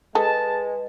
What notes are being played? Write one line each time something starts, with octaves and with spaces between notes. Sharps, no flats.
G#3 G#4 A4 B4 A5